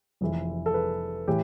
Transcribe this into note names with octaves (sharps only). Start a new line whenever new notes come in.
F1 F2 E3
A4
B4
A2 E3 G4